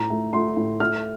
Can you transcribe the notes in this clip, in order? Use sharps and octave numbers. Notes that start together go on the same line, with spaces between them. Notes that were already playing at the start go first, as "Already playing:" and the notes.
Already playing: A2 A#5
A3
A3 C6
A2
A3 F6